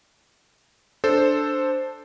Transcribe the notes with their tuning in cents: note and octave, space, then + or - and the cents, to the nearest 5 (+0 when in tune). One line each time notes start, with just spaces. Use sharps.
D4 +0 A4 +0 C5 +0